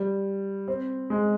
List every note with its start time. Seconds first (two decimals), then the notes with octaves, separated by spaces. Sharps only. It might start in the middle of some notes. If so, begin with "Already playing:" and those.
Already playing: G3
0.68 C4
1.10 G#3